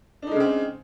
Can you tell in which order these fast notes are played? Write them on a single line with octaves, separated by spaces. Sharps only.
D4 D#4 G#3 C#3 C4